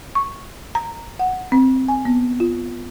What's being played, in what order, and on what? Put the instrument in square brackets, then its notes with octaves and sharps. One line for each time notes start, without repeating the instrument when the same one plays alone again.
[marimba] C#6
A#5
F#5
C4
G#5
B3
F4